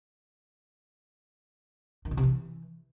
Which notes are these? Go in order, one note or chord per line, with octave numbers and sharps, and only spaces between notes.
D#3
B2
C3
E3